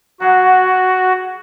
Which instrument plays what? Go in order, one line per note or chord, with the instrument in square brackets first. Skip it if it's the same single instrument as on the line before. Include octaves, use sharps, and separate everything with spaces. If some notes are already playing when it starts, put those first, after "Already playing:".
[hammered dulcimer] F#3 G#4 F#5 [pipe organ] F#4